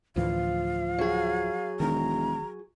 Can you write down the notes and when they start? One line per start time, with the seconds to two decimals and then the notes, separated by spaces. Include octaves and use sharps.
0.16 D2 A2 E3 F3 F5
0.99 F#3 G#4
1.80 E1 D#3 A#5